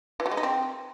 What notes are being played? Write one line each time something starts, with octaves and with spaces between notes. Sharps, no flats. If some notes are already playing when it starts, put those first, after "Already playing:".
E3
F#3
G#3
D#4
C4